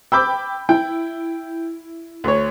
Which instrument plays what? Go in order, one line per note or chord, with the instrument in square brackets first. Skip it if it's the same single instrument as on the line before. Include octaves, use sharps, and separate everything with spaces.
[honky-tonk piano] G5 B5 G6 [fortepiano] D6 E6
[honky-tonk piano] E4 [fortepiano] G5
[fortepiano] D2 C#5